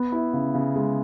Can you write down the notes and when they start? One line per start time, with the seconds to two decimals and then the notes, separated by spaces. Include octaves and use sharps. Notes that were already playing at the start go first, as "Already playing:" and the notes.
Already playing: B3
0.12 E4
0.33 C#3
0.55 C#3
0.76 G#3